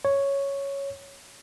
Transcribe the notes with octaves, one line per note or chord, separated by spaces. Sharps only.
C#5